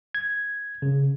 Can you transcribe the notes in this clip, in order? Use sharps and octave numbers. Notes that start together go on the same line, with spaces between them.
G#6
C#3